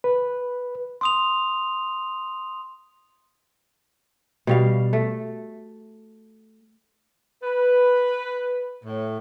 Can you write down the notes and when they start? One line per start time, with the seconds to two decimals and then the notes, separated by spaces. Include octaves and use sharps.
0.04 B4
1.01 C6 D#6 F7
4.47 B2 G3 F5
4.93 A3
7.43 B4
8.84 A2